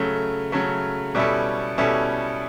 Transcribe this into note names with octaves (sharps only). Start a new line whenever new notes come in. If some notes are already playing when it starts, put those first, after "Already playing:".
Already playing: C#3 F#3 A3
C#3 F#3 A3
B2 G3 C#4 E4 A4
B2 G3 C#4 E4 A4